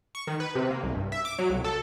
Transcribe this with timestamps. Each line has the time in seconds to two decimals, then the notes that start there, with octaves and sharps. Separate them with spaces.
0.15 C#6
0.27 D#3
0.40 B4
0.55 C3
0.71 A#3
0.83 C2
0.94 G2
1.12 E5
1.25 D6
1.39 F#3
1.50 C2
1.64 A4